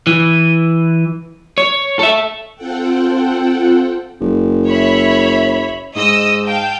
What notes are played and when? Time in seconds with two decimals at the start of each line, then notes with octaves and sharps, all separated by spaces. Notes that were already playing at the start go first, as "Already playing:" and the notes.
0.07 E3
1.58 C#5
1.99 A4 E5
2.56 C4 F4 A4 F#5 G5
4.21 F#1
4.68 C#5 E5 B5
5.96 G#2 D#5 D#6 E6
6.44 F5 G5 A5